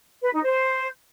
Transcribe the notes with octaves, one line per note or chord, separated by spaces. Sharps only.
B4
D#4
C5